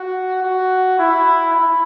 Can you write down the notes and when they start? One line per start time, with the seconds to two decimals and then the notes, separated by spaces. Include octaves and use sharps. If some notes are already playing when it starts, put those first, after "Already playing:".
Already playing: F#4
0.43 F#4
0.99 E4
1.53 E4